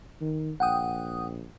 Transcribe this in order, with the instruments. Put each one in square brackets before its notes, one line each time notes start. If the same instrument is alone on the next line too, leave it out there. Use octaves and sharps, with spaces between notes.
[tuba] D#3
[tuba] A#1 [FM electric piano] F#5 G5 D#6